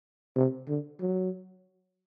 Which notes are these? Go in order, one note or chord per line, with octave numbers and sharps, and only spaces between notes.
C3
D3
F#3